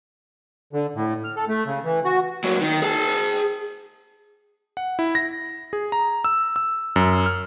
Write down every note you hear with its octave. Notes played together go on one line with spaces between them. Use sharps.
D3
A2
F6
A4
A3
C#3
E3
F#4
A#2 F#3
D#3
G#4 A5
F#5
E4
A#6
G#4
A#5
E6
E6
F#2
F6